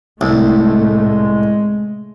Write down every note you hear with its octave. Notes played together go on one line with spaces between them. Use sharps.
C2 A2 G#3 A3